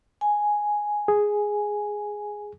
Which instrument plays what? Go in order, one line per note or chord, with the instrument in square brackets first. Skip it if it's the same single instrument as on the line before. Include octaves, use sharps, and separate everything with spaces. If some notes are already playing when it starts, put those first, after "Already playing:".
[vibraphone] G#5
[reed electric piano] G#4